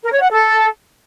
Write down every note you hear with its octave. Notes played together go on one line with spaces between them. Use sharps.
A#4
C#5
F#5
A4